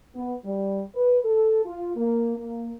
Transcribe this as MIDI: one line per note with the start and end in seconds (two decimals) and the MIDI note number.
0.15 0.35 59
0.45 0.82 55
0.95 1.19 71
1.25 1.63 69
1.65 1.93 65
1.96 2.36 58
2.37 2.74 58